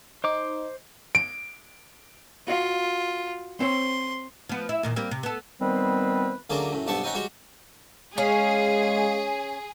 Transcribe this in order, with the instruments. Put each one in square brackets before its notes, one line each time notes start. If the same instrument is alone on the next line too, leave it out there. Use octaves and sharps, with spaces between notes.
[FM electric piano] D#4 [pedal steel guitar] C5 D6
[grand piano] D7
[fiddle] F4 [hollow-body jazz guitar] F#4 D#5 F5
[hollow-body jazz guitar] C4 C5 C#5 [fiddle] C6
[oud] F3 B3
E4
E2 A#2 D#3
G3 A#3 C4
C3
B3 A4
[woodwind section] D#3 G3 B3 C4 B4 C5
[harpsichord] D2 F#3 A#3 C#4 G#4 D5
F#2 A2
B1 G2 B3 C4 A5 C#6
C4 C#4 D#4 F#5 G#5
G3 G#3 F#4 C#5
[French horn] G#3 [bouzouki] C#4 [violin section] G#4 [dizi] F5